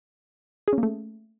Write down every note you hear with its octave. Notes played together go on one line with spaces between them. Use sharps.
G#4
C#4
A#3
A3